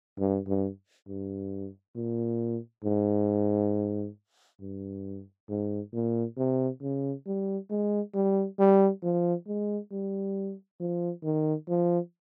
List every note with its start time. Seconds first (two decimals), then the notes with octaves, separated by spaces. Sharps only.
0.19 G2
0.48 G2
1.07 G2
1.96 A#2
2.84 G#2
4.61 G2
5.50 G#2
5.94 A#2
6.38 C3
6.82 C#3
7.27 G3
7.70 G#3
8.15 G3
8.59 G3
9.03 F3
9.47 G#3
9.92 G3
10.80 F3
11.23 D#3
11.68 F3